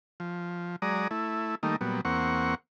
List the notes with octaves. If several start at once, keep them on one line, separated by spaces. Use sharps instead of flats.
F3
F#3 G#3 D5 A#5 D#6
A3 E4
D#3 G3 A3 A#3 D#4
A#2 F#3 G3 B3
E2 A#3 C4 F#5 C#6